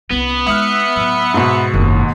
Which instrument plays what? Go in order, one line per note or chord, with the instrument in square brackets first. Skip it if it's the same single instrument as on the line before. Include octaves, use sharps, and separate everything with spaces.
[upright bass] C2 C#4 [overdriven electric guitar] B3
[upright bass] G#3 D#4 [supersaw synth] E5 F#6 C#7 [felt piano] D#6 F6
[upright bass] A2 F#3
[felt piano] G#2 B2
[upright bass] F#1 C#3 [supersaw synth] D#2